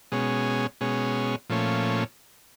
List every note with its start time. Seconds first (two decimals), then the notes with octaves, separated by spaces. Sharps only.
0.12 B2 G#3 C#4
0.81 B2 G#3 C#4
1.49 A#2 F3 A3 C#4